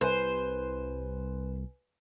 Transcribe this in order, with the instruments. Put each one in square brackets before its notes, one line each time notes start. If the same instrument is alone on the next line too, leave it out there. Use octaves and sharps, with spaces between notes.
[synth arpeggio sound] C2 [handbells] B4 G#5 [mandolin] C5